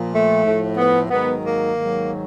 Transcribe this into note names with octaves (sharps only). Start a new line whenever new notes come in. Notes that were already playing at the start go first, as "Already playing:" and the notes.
Already playing: A#2 F3
A3
A2 F3
B3
G#2 D#3 F#3 B3
A#3
G#2 D#3 F#3